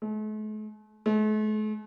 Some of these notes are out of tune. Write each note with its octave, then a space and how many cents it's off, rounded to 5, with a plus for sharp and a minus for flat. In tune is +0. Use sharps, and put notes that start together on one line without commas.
A3 -45
A3 -45